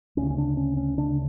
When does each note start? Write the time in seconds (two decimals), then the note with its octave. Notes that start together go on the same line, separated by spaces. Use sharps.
0.17 D2 C#3 C#4
0.30 C#4
0.38 D4
0.57 C#4
0.77 C#4
0.97 D2 C#3 D4